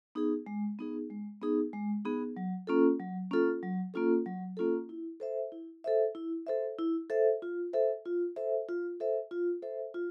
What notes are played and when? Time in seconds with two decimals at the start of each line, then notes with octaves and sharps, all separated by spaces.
0.15 B3 D#4 G#4
0.46 G#3
0.79 B3 D#4 G#4
1.10 G#3
1.41 B3 D#4 G#4
1.73 G#3
2.05 B3 D#4 G#4
2.37 F#3
2.67 A#3 C#4 F4 A4
3.00 F#3
3.31 A#3 C#4 F4 A4
3.63 F#3
3.94 A#3 C#4 F4 A4
4.26 F#3
4.57 A#3 C#4 F4 A4
4.89 E4
5.20 A4 C5 E5
5.52 E4
5.84 A4 C5 E5
6.15 E4
6.47 A4 C5 E5
6.79 E4
7.10 A4 C5 E5
7.42 F4
7.73 A4 C5 E5
8.05 F4
8.36 A4 C5 E5
8.69 F4
9.00 A4 C5 E5
9.31 F4
9.62 A4 C5 E5
9.94 F4